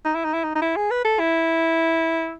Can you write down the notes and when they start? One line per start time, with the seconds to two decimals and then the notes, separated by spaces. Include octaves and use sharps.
0.05 D#4
0.15 E4
0.24 D#4
0.34 E4
0.44 D#4
0.55 D#4
0.62 E4
0.76 G#4
0.91 B4
1.05 A4
1.19 E4